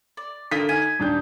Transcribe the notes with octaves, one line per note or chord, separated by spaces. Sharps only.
D5
D3 A#3 F4 D#6 B6
D#4 G#5
D#1 D4 G6